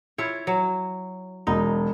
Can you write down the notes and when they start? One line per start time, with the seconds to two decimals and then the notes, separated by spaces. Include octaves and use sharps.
0.18 E4 F4 C#5
0.47 F#3
1.47 E1 D#4